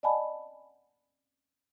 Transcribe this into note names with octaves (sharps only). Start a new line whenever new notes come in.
D5 D#5 F#5 G#5 A5 B5